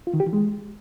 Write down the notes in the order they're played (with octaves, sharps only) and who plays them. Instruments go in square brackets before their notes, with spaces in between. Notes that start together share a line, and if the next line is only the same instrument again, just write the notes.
[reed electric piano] F4
D#3
G4
E3
G#3